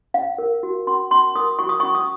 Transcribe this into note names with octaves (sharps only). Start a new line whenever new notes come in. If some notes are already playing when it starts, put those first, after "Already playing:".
C#4 F5
A#4
F#4
C#4 C6
C#4 C6
A#4 D#6
F#4 C#6
D#6
C#6
C#4
D#6